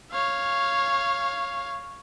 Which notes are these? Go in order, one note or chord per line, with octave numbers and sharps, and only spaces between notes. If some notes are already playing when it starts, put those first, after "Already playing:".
C#5 F5